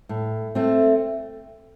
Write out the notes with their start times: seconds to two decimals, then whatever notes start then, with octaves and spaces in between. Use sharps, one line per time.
0.09 A2
0.55 A3 C4